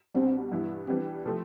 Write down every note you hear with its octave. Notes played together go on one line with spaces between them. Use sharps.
C2 B2 G3 C4 D4
G2 E3 B3 E4
E3 G3 C4 D4 G4
C3 F3 A3 C4